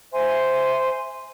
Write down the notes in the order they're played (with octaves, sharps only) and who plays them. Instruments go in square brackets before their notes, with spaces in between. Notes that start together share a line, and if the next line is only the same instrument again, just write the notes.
[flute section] C5 E5 G#5 C6